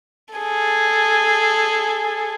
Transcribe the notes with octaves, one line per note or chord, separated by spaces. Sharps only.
G#4 A4